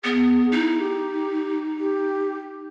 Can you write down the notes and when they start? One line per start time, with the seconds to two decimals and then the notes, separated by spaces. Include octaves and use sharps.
0.04 B3 G#4
0.52 D#4 E4
0.79 G4
1.79 G4